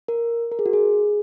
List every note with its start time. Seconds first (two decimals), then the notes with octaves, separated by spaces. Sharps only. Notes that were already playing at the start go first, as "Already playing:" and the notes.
0.08 A#4
0.52 A#4
0.59 G#4
0.66 F#4
0.73 G#4